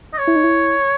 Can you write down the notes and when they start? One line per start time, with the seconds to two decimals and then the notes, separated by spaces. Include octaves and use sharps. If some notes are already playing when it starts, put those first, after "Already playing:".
0.13 D#5
0.18 C#5
0.27 E4
0.36 D#4
0.44 E4